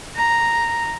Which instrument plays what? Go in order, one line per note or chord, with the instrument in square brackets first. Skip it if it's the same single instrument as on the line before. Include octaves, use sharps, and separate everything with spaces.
[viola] A#5